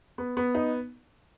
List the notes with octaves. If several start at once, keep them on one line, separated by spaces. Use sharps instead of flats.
B3
B3
D#4